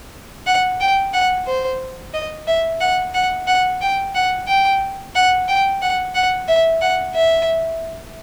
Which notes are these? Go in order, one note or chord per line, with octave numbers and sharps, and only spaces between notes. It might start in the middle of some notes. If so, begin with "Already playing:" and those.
F#5
G5
F#5
C5
D#5
E5
F#5
F#5
F#5
G5
F#5
G5
F#5
G5
F#5
F#5
E5
F#5
E5